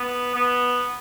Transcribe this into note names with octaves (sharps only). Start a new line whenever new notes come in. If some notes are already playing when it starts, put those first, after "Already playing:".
Already playing: B3
B3